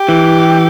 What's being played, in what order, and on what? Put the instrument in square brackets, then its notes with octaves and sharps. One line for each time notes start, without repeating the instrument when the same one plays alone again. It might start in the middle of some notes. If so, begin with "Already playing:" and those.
Already playing: [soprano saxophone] G4
[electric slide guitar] E3